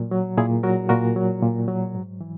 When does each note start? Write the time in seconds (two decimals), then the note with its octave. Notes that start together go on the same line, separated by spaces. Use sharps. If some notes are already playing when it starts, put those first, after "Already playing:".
Already playing: A#2 F#3
0.11 F#3
0.37 A#2 E4 G#4
0.63 F#3 F#4 A#4
0.89 A#2 F#4 A#4
1.16 F#3
1.42 A#2
1.68 F#3
1.94 G#2
2.21 E3